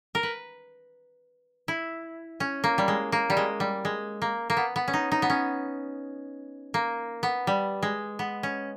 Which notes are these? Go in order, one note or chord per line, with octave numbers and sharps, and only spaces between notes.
A#4
B4
E4
C#4
A#3
G3
G#3
A#3
G3
G#3
G3
G#3
A#3
A#3
B3
B3
C#4
D#4
D#4
B3
C#4
A#3
B3
G3
G#3
B3
C#4